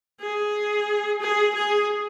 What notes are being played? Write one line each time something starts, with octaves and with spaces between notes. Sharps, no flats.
G#4
G#4
G#4